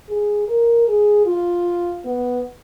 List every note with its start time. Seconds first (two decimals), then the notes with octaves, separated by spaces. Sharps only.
0.09 G#4
0.48 A#4
0.88 G#4
1.26 F4
2.05 B3